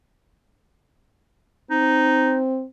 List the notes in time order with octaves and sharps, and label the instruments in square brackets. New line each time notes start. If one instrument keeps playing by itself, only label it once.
[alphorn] C4 [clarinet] D#4